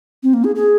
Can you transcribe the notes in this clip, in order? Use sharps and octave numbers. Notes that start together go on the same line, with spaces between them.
C4
A#3
G#4
G#4